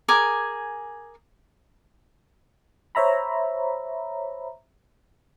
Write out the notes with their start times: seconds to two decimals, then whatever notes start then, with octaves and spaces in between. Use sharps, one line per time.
0.08 G#4 A#4 G#5 D6
2.95 C5 C#5 E5 A#5 B5